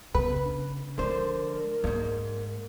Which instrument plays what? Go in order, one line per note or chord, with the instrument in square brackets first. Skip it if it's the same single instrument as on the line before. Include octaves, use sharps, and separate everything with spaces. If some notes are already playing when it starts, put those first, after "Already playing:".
[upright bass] C#3 [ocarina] B3 [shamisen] B4
[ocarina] D4
[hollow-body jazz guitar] D3 C5 [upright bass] F3 G#3 [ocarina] A#4
[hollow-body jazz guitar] F2 G#2 [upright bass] A#3